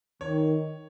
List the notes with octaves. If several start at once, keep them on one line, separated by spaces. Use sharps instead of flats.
D#3 C#5